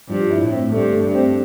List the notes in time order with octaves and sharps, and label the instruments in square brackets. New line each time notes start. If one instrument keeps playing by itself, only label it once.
[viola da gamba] G2 [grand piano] F3
[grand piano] E4
[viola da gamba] A2
[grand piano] C4
[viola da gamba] G2 [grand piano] A3
[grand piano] A3
[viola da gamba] G2
[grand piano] C4